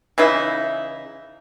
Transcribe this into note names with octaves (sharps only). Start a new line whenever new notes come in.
C#3 E3 D#4 E4